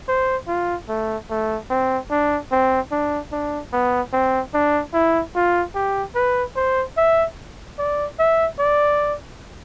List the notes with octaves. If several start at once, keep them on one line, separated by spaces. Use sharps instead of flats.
C5
F4
A3
A3
C4
D4
C4
D4
D4
B3
C4
D4
E4
F4
G4
B4
C5
E5
D5
E5
D5